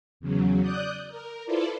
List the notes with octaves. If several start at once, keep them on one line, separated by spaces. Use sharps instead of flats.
E2 C#3 F#3
D5 D#6 F#6 G6
A#4
E4 F4 A4 B4 C5 D5